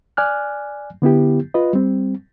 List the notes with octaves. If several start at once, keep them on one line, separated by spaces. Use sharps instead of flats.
D5 G#5 F6 F#6
D3 B3 E4 G4
F4 B4 D#5
G3 C4